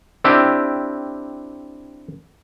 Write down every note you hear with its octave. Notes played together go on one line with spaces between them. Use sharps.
C4 D4 E4 G4